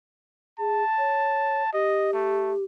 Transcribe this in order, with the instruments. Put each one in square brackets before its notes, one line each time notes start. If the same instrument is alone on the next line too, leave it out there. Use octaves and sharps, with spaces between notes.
[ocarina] G#4 [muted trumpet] A5
[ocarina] C#5
[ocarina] G4 [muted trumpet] D#5
[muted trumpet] A3